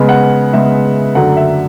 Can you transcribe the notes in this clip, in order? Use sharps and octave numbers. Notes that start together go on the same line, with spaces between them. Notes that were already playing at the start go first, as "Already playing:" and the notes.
Already playing: C#3 G#3 B3
F#5
C#3 G#3 B3 E5
F#2 D3 F#3 A3 F#5
E5